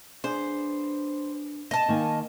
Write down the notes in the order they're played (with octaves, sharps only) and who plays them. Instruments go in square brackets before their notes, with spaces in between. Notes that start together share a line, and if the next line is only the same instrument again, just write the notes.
[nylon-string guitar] B3 D4 G#4 [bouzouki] C5
[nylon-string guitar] B3 [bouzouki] D#5 A5
[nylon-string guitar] D#3 A#3 G#5